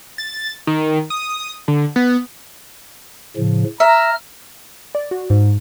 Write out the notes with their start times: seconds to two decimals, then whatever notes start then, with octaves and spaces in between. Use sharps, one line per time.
0.18 A6
0.67 D#3
1.10 D#6
1.68 D3
1.96 B3
3.36 A2 C#3 F3
3.80 E5 A#5 F6
4.95 D5
5.11 F#4
5.30 G#2